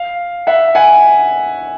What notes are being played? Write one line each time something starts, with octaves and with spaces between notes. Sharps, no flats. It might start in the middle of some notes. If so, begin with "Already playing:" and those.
Already playing: F5
E5 F#5
F#5 G#5